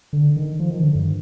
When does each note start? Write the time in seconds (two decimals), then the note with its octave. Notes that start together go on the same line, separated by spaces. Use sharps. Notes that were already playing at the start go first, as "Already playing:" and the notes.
0.13 D3
0.36 D#3
0.60 F3
0.71 D#3
0.83 D3
0.95 G2